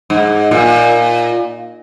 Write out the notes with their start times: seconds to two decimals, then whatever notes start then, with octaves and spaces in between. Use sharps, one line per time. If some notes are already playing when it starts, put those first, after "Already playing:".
0.10 G#2
0.51 A#2